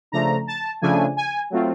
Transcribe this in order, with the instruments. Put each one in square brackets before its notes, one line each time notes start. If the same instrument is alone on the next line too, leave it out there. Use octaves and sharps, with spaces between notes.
[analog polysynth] C#3 F3 A3 D4 A#5
A5
C#3 F3 A3 D4 G#5
G#5
F#3 A3 C4 F4